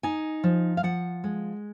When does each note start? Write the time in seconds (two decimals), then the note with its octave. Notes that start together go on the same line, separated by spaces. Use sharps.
0.03 D#4 G#5
0.44 F3
0.77 F5
0.83 F3 F#5
1.24 G#3